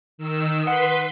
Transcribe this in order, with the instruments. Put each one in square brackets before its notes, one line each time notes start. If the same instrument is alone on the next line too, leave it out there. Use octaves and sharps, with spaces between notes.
[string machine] D#3 E6
[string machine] B4 B5 C6 [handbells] F#5 D#6